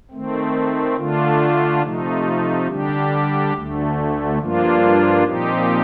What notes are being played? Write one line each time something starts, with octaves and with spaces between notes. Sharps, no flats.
D#3 A3 C4
D3 A3 D4 F4
C3 F3 A3 D#4
D3 G3 D4 G4
D2 D3 A3
G2 F3 A#3 D4 F4
A#2 F3 C4 D#4 G4